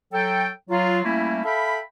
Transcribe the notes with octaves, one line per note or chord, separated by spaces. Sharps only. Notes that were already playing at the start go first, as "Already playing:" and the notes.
F#3 A4 G5
F#3 F4
G3 A3 A#3 C#4 E4
A4 E5 F5 G5 B5